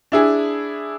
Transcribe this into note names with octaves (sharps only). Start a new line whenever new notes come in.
D4 E4 G#4